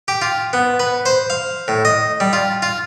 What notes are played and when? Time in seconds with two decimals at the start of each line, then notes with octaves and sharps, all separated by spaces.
0.08 G4
0.22 F4
0.53 B3
0.80 B4
1.06 C5
1.30 F5
1.68 A2
1.85 D#5
2.20 G3
2.33 F4
2.62 F4